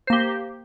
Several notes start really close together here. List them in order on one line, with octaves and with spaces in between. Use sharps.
C5 A#3 G4